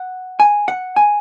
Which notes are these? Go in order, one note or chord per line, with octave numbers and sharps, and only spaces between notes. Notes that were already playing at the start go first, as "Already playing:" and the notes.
Already playing: F#5
G#5
F#5
G#5